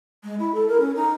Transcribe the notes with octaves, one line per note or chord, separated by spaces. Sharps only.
G#3
E4
A4
A#4
C#4
D#4